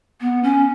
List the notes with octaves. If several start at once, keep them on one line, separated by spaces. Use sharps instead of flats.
B3
C#4